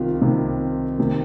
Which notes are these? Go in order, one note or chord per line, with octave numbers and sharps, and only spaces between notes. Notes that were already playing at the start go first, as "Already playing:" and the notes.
Already playing: C2 C3 D#3 F4
C2 C3 D#3
C3 D#3